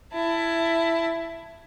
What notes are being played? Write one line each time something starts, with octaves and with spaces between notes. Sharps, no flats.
E4 A5